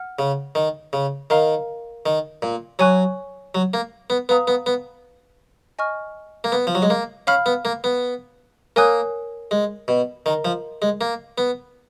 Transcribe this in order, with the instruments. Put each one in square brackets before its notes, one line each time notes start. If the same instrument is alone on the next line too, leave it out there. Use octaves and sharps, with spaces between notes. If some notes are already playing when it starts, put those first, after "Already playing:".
Already playing: [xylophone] F#5 F6
[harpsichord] C#3
D#3
C#3
[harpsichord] D#3 [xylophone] A#4 F5 A#5
[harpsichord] D#3
A#2
[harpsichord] F#3 [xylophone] C#5 G#5 C#6 F#6
[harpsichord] F#3
A#3
B3
[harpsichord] B3 [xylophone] B4 F5 A#5 D#6
[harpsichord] B3
B3
[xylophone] D#5 G#5 C#6 F6
[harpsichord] A#3
B3
F3
F#3
G#3
A#3
[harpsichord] C#4 [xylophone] F5 B5 F6
[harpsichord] B3
A#3
B3
[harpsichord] A#3 [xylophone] A#4 C#5 G#5 D#6 F#6
[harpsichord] G#3
B2
[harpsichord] D#3 [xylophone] A#4 D#5 A#5
[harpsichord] F3
G#3
A#3
B3